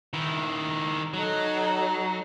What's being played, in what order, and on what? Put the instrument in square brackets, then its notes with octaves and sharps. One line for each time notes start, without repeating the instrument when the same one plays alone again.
[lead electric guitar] D#3 E4
[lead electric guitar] F#3 [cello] D#4 A4 [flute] A#5